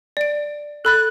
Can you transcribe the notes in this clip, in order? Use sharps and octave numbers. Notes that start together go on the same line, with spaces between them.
D5 D7
A4 B5 F#6 A6